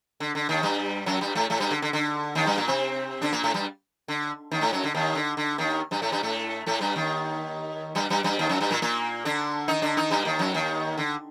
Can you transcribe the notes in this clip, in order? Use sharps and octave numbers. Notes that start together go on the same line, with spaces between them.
D3
D3
D#2 D#3
G2 G3
F#2 F#3
G2 G3
A2 A3
A2 A3
G2 G3
D3
D3
D3
D#2 D#3
G2 G3
A#2 A#3
C3 C4
D3 D4
A#2 A#3
A2 A3
G2 G3
D3
D#2 D#3
A2 A3
F#2 F#3
D3
D#2 D#3
D3
D3
D#2 D#3
G2 G3
A2 A3
G2 G3
A2 A3
A2 A3
G2 G3
D#2 D#3
G2 G3
G2 G3
G2 G3
D#2 D#3
F#2 F#3
G2 G3
A#2 A#3
A#2 A#3
D3 D4
D#3 D#4
D3 D4
D#3 D#4
G2 G3
D#2 D#3
F#2 F#3
D#2 D#3
D3